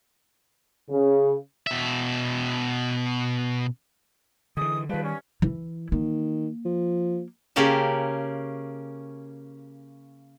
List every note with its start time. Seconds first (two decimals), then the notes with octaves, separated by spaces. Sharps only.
0.90 C#3
1.67 B2 E5
4.57 D3 E3 G#3 D#6
4.89 C#2 D#3 F3 G3 B4
5.04 G2 C#4
5.42 E3 E4
5.92 D#3 A#3
6.65 F3
7.56 C#3 A#3 C#4 G4 A5